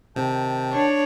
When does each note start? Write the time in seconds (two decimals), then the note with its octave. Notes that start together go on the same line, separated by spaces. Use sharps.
0.16 C3 D#3 A5 G6
0.72 D4 C#5